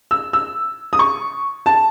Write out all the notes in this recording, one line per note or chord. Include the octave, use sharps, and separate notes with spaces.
E6
E6
D#6
C#6
A5